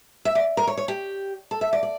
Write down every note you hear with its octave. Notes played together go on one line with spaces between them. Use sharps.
E5
D5
A#4
C#5
C#5
G4
A4
E5
D5
D5